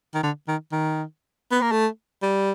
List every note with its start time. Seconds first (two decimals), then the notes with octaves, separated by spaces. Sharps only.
0.14 D#3
0.23 D3
0.48 D#3
0.72 D#3
1.51 B3
1.61 A#3
1.72 A3
2.22 G3